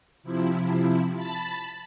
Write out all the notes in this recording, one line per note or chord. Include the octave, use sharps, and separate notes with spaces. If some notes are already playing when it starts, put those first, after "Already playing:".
C3 F3 E4
A5 B5 A6